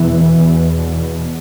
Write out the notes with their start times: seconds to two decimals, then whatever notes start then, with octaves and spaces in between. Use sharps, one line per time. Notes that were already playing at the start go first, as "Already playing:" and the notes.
Already playing: E2 B2 E3
0.34 E2 B2